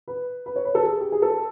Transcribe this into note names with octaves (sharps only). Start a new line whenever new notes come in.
B4
B4
C#5
B4
A4
G#4
G4
G#4
A4